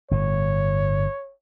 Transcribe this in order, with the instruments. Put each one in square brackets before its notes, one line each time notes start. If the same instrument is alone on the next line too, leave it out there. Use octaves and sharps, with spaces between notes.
[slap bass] G1 A2 [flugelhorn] C#5